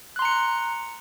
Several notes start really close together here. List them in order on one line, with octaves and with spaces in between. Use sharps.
F#6 C6 A#5 C#7